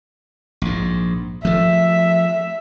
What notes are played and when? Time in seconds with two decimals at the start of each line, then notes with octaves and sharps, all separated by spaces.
0.62 A#1 G#2
1.45 F3 A3 E5